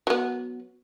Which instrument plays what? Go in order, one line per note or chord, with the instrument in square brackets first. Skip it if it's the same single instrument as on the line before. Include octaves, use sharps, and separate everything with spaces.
[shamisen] F#3 B3